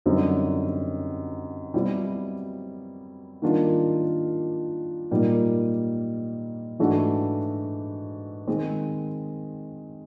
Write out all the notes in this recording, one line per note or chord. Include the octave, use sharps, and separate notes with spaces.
F#2 D3 G3 C4 D#4
B2 G3 C4 E4
D#3 G3 A#3 D4 F4
A#2 G3 A#3 D#4
G#2 E3 A3 D4 F#4
D#3 G#3 C4